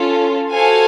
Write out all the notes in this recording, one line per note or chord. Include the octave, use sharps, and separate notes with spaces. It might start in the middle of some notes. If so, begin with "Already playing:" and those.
Already playing: C#4 F4 A4
F#4 A4 C5 F5 G#5